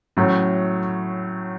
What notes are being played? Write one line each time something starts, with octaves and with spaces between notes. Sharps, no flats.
A2 F#3 A3 C#4